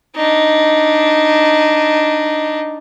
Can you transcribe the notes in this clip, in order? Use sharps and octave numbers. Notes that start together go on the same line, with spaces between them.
D4 D#4